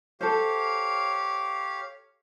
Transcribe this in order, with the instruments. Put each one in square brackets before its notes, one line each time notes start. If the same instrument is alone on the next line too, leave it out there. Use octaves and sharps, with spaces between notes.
[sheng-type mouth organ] G4 C#5 F5 [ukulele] A4 C5